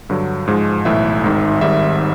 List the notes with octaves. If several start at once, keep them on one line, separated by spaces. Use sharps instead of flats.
G2 D3 F#3
G#2 F3 G#3
B1 A2 E3 E5
G#1 G#2 D#3
G#1 G#2 D#3 G3 E5